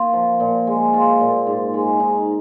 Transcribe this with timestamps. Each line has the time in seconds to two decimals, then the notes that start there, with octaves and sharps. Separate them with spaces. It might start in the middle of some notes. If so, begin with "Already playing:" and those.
Already playing: A#3 F4
0.13 F3
0.40 A#2
0.67 G#3
0.94 F4
1.21 A#2
1.47 G#2
1.74 G#3
2.00 D#4